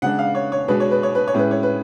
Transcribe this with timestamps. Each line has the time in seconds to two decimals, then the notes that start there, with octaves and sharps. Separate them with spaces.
0.02 C#3 G#3 D4 F#5
0.19 F5
0.35 C#5
0.52 C#5
0.68 B2 G#3 B3 D4 B4
0.80 C#5
0.91 B4
1.03 C#5
1.15 B4
1.27 C#5
1.34 A2 G#3 C#4 B4
1.51 C#5
1.63 B4